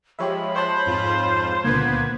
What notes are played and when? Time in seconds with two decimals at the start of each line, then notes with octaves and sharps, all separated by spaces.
0.19 F3 G#3 G4 C#5 E5 B5
0.56 C5 C#5 A5 F#6
0.86 F2 G#2 F4
1.64 C#2 A#2 D3 A#3 B3 B4 G#6